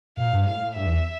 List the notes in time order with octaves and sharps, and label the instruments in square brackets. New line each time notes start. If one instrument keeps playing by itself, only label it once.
[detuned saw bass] A#2 [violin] F5
[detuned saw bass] G2
[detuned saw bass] A2 [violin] F5
[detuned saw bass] A2
[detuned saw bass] G2 [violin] E5
[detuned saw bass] E2